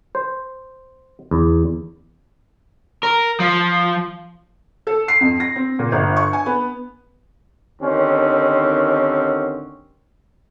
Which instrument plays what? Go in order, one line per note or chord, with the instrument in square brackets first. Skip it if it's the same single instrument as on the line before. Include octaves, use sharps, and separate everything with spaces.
[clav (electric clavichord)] C5
E2
[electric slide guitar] A#4
F3
[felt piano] A4
C7
F2
A#6
C4
A#2
G1
C#6
G#5
B3
[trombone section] D#2 D3 D#3 C4 C#4